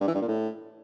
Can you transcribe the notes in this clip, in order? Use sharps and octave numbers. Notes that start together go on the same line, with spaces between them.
G2
E3
G2
A#2
A2